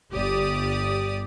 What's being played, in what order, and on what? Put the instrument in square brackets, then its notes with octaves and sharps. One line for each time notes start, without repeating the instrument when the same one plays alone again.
[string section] G1 G4 D5 D#6